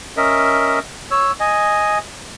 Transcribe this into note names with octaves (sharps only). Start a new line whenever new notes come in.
C#4 A#4 D#5 E5
C#5 E6
D#5 G#5